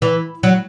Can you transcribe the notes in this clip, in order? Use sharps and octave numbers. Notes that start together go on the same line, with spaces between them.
E3
F#3